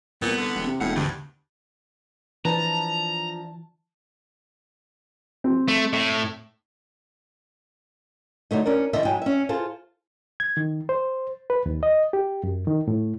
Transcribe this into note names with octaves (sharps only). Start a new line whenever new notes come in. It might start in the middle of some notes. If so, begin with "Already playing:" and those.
C2 A#2 B3
D3
E1
C3
E1 A2 F#5
D2 G2
E3 F3 D4 B4 A5 A#5
C4
A3
A2
D3 F#3 A3 D#4
C#4 D4 A#4
E2 D3 D#5 E5
G#2 F#3 G5 G#5
C#4 E5
F4 G#4 A4 C5
G#6
D#3
C5
B4
D#2
D#5
G4
F#2
D#3
A2